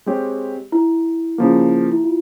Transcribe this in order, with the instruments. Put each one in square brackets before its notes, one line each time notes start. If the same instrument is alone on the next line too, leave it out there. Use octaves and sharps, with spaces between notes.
[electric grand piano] G#3 C4 G4 C#5
[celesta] E4
[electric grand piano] C#3 F3 A#3
[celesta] E4
F4